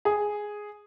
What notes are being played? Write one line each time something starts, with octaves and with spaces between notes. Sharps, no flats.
G#4